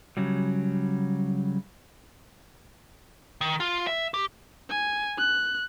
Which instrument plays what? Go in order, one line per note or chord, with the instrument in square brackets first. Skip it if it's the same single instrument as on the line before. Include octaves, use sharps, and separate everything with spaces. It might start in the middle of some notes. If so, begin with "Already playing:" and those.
[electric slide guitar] C#3 F#3 G3
[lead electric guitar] D#3
F4
E5
G4
[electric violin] G#5
F#6